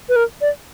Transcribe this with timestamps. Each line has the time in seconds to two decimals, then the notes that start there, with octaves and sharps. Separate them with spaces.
0.09 B4
0.16 A#4
0.41 D5